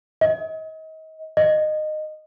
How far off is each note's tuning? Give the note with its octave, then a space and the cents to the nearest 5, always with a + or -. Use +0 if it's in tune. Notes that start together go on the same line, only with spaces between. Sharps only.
D#5 +35
D#5 -20